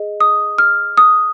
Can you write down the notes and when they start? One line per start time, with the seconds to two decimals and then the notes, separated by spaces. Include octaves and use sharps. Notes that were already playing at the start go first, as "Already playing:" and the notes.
Already playing: G#4 D#5
0.20 D#6
0.58 F6
0.97 D#6